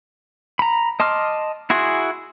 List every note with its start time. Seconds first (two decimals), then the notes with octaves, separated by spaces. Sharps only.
0.59 A#5 B5
1.00 D#5 A5 C6 D6 F6
1.70 E4 F#4 G#4 G#5 C6